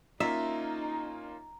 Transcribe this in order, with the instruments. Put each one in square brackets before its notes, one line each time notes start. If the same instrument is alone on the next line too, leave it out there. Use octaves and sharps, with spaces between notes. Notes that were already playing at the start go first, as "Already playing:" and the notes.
[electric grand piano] A#3 C#4 F4 [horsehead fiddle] D#4 [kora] E5 [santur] A#5